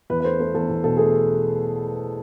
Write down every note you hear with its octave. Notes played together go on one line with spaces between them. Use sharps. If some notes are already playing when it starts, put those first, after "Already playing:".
E2 B4
B4
A3 C5
A3 C5
E2 A4
E2
B2 A4
A3 G#4